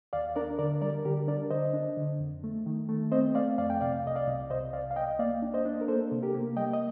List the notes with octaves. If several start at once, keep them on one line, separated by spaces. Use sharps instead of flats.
D#2 D5 F5
D4 A#4 D5
D3 A#4 D5
G3 A#4 D5
D3 G4 A#4
D4 A#4 D5
D3 C5 D#5
D4
D3
F2
A3
D#3
A3
C4 C5 D#5
A3 D5 F5
F2 D5 F5
G5
C3 D5 F5
C2 D#5
D5 F5
C2
C3 C5 D#5
C2 D5 F5
F5
C2 D#5 G5
D#5
A#3 D5 F5
D4
C5 D#5
D4
A#4
A#3 A4 C5
C3
G4 A#4
A#3
G3 D#5 G5
D#5